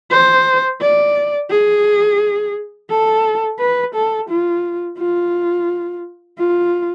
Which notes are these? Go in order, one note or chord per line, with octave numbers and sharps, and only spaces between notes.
C5
D5
G#4
A4
B4
A4
F4
F4
F4